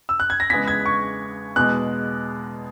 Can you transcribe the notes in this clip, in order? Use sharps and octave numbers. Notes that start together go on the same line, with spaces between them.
E6
F#6
G#6
A#6
E2 C#3 G#3 B3 B6
G#6
C#6
E2 B2 G#3 B3 F#6